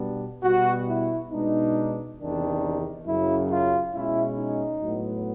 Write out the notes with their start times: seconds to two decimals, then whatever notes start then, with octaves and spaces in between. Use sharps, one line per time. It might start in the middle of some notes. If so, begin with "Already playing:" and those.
Already playing: B2 G3 B3 D4
0.43 B2 G3 B3 F#4
0.87 E4
1.31 B2 G#3 B3 D4 D#4
2.18 E2 C3 D#3 D4
3.05 F#2 C#3 F#3 E4
3.50 F4
3.94 B2 G#3 C#4 E4
4.37 D#4
4.81 A2 F#3 B3